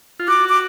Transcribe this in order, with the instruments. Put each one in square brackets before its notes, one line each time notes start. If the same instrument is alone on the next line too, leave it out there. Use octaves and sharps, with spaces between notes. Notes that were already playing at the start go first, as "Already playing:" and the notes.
[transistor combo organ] F4
[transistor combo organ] F#4 [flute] D6
[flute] D6